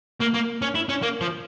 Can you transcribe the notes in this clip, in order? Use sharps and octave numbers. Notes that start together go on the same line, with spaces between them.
A#3
A#3
C#4
E4
C#4
A#3
F3